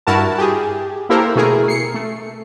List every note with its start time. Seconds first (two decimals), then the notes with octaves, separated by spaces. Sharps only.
0.07 G2 E4 F#4 A#4 A5
0.38 G4 G#4
1.09 A#3 E4 G4 A4 A#4 C5
1.36 B2 A3 E4 G#4 A#4
1.68 C7 C#7
1.94 A3